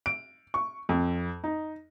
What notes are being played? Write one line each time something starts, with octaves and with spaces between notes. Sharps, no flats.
D7
C#6
F2
D#4